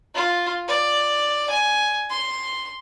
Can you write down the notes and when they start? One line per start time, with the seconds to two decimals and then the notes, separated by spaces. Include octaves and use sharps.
0.15 F4
0.68 D5
1.50 G#5
2.10 C6